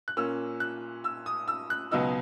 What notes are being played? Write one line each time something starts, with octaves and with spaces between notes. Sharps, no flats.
F#6
A#2 A#3 C#4 E6
F#6
E6
D#6
E6
F#6
C#2 B2 F#3 B3 D#4 E6